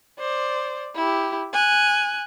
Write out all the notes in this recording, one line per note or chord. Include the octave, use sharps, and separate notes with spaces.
C5 D5
E4 G4
G#5 F#6